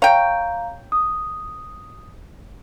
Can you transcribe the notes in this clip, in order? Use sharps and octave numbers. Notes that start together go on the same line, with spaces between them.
C#5 F5 G5 A#5
D#6